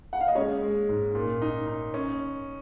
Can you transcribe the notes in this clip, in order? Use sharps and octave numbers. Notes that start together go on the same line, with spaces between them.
F#5
F5
D#5
G#3 C#4 C#5
G#3
G#2
A#2
D#4
D#4
C#4